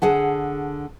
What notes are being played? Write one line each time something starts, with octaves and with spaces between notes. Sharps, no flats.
D3 G#4 F#5 A5